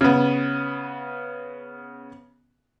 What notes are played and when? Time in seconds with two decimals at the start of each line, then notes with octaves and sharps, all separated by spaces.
0.01 C#3 B3